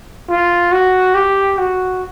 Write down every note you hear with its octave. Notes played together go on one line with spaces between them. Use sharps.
F4
F#4
G4
F#4